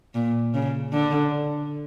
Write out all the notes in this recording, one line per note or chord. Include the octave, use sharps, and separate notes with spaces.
A#2
C#3
D3